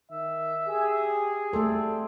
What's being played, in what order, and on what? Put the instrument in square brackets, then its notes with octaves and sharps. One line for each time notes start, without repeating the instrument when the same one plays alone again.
[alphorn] D#3 [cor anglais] E5
[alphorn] G4 [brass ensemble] G#4
[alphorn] G3 [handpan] A3 A4 [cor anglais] C4